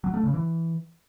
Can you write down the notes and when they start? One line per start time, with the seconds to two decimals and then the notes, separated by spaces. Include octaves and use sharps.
0.04 F#3
0.14 A3
0.24 C#3
0.34 E3